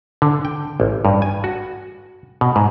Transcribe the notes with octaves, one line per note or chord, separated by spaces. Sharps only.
D3
G5
A1
G2
G#5
F#4
B2
G#2